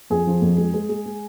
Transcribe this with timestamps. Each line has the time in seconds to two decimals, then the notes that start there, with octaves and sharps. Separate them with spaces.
0.10 F2 G#4
0.27 F3
0.42 F2
0.58 G#3
0.74 G#3
0.89 G#3
1.06 G#3